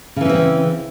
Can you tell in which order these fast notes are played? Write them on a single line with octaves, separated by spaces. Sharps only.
C#3 E3 C#4 C4